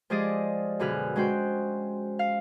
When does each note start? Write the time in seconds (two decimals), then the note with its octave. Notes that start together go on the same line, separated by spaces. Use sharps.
0.10 F3 G#3 G4 G#4 D5 D#5
0.79 F#2 B2 D3 G#4 B4 F6
1.16 G#3 C#4 F#4 C5 G5
2.19 F5